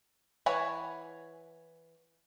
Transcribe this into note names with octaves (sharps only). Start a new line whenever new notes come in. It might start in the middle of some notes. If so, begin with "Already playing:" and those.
E3 C#5 F#5 G#5 B5